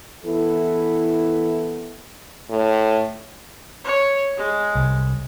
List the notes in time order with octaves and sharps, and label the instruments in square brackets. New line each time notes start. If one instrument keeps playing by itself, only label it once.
[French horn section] E3 B3 E4 A4
[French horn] A2
[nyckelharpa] C#5
G#3
[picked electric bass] C2